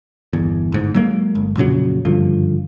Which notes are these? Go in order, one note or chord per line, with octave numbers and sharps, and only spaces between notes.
G1 E2
G1 G#2
F#3 G#3 A#3
G1
F2 A#2 C#3 F#3
F#1 G2 D3 F3